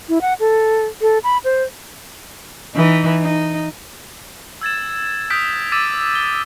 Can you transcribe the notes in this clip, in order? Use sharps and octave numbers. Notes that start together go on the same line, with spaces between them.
E4
F#5
A4
A4
B5
C5
E3 D#4
D#4
E6 G#6 A6 E7
D#6 F6 G6 B6 D7
D6 E6 A6 B6 D#7 E7
G7